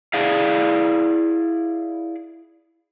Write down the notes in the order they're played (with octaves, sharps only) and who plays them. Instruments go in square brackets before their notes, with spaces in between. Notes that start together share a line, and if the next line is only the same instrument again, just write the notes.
[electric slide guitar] E4 G#4 D5 F5